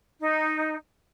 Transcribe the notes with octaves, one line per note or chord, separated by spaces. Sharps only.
D#4